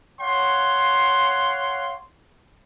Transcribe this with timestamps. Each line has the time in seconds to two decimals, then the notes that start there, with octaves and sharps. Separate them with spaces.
0.21 C#5 F5 F#5 C6